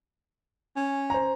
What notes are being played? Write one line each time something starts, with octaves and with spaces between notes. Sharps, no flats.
C#4
C5 A#5